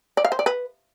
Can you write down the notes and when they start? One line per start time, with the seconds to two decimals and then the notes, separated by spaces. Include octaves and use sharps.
0.17 D5
0.25 F5
0.32 C5
0.39 D5
0.46 B4